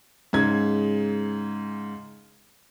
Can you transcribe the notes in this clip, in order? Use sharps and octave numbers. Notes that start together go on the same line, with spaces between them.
G#2 C#3 G#6